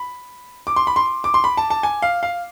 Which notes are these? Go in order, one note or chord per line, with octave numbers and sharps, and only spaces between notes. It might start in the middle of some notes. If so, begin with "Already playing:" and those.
Already playing: B5
D6
C6
B5
C6
D6
C6
B5
A5
A5
G#5
F5
F5